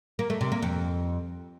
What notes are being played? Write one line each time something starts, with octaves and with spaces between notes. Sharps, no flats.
A#3
A3
C3
A#3
F2